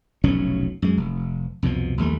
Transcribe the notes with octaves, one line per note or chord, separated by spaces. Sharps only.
F1 B1 A2 C#4
F#2 G#3
F1
C2 F2 B2 F3
A#1 D#2 G3 A3